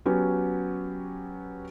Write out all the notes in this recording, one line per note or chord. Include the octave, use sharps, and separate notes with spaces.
F#3 B3 C#4 G4